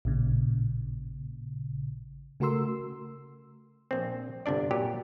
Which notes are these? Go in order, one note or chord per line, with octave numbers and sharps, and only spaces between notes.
A1 A#2 C#3
C#3 A3 F#4 A#4 C6 E6
A#1 C4
G1 C3 D4 D5
A#2 F#3 G4